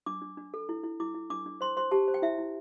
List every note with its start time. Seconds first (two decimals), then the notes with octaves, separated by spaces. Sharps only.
0.06 D4 D6
0.22 D4
0.37 D4
0.54 A4
0.69 E4
0.83 E4
1.00 E4 D6
1.14 E4
1.30 D4 D6
1.46 D4
1.61 C5 C6
1.77 C5 C6
1.91 G4 A5
2.08 C5
2.14 G5
2.22 E4 E5
2.38 E4